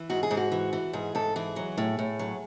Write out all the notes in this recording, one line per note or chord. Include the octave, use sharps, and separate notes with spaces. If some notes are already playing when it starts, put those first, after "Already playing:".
Already playing: E3
G#2 F#4
G#4
G#2
F#4
E3
E3
G#2 G#4
G#2 A4
E3 G#4
F#3
A2
A2
F#3